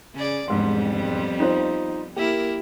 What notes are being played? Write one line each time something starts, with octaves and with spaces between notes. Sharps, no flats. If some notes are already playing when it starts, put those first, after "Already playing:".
C#3 G#4 D5
E1 F2 G#2 G3 B3 C6
D#4 F4 C5
A#3 E4 G4 A#4